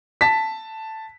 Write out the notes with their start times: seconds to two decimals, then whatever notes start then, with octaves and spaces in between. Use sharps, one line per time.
0.21 A5 B6